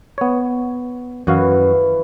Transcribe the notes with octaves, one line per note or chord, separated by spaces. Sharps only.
B3 C#5
F#2 E3 F#4 F5